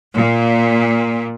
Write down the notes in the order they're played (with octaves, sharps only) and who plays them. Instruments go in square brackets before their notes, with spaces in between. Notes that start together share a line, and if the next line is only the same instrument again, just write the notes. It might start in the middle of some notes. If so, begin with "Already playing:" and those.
[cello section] A#2